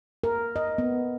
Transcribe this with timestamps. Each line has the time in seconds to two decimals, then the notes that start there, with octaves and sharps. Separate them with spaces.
0.24 A#4
0.56 D#5
0.78 B3